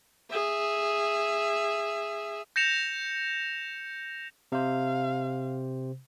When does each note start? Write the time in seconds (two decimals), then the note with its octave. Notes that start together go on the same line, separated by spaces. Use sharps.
0.30 G#4 E5
2.56 G6 A#6 C#7 E7 F7
4.52 C3 C5 F5